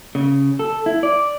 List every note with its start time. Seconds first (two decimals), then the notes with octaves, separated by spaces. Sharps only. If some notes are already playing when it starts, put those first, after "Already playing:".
0.15 C#3
0.59 A4
0.86 E4
1.03 D5